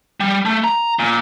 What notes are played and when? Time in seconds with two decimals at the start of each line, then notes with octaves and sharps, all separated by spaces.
0.20 G3
0.45 A3
0.64 A#5
0.99 A#2